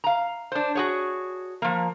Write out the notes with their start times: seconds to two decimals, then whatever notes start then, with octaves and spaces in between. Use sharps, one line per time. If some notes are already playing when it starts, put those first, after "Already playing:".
0.04 F5 A#5
0.52 D4 C5
0.75 F#4 G#4 C#5
1.62 F3 A#3